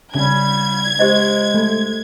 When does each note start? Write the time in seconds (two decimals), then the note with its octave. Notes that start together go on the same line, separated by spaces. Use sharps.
0.15 C#3 G3 C#4 G#6
0.99 G#3 G4 C5 D#5
1.54 A3